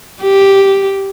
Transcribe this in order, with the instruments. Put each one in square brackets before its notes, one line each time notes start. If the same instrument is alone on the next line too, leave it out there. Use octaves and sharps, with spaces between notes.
[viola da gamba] G4